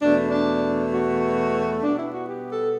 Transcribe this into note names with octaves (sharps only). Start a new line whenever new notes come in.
E2 B2 A3 D4
D4
F#4
B2 G3 B3 D4
E4
F#4
G4
A4